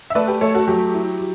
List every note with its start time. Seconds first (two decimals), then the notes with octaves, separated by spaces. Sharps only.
0.10 E5
0.15 A3 B4 D5
0.28 G4 B4
0.41 A3 A4 C#5
0.54 F#4 A4
0.67 F#3 G4
0.94 E4
1.19 F#3